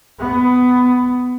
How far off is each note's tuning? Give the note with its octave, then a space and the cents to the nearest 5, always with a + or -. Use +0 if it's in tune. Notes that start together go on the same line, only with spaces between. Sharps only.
B3 +15